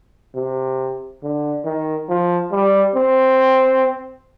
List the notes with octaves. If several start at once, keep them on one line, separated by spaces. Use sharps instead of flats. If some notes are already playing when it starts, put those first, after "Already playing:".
C3
D3
D#3
F3
G3
C4